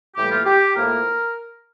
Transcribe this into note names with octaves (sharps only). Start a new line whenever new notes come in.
A2 E3 G3 A#3 G4
F4
G4
A2 F3 A#3 A#4